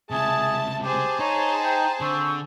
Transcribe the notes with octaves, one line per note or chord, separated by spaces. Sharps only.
C#2 C3 G#4 E5 A5
G4 G#4 C5 A5
D#4 C#5 A#5
G5 A#5
D3 C4 C#6